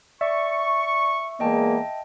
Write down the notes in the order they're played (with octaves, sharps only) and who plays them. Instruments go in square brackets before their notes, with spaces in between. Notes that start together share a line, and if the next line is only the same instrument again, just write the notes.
[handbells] D5 [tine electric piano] E5 [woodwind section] C#6
[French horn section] E2 G#3 A#3 [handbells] D#5 G5 A5